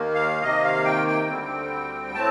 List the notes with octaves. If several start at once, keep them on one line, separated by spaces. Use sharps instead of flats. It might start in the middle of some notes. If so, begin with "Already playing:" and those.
Already playing: D#2 D#3 A#3
F5
C3 D#3 A#3 D#5
F5
G5
G5
D2 D3 G3 C4
A2 A3 C4 A5